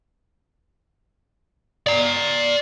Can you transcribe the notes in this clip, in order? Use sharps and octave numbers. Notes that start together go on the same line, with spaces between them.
D5 A#5